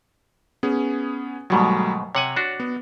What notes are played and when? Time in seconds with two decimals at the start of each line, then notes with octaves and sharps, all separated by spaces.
0.63 B3 C#4 G#4
1.50 G#2 B2 D#3 F#3 G3 A3
2.15 C3 C#5 F#5 G#5
2.36 D4 F#4
2.60 B3